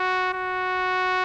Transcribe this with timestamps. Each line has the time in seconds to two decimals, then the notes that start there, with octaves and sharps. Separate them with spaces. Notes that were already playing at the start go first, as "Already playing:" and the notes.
Already playing: F#4
0.34 F#4